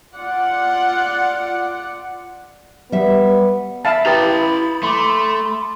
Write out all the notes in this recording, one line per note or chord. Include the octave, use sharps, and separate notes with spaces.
F4 D5 F#5
G3 B3 E5
E5 F5 A5 B5
E4 G4 B4 A#5 D#6 A6
A3 C6 D6